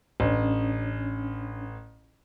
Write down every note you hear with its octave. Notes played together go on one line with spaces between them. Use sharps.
A1 C#4 D4